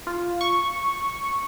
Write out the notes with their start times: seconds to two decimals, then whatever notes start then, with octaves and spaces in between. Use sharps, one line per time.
0.07 F4
0.41 C#6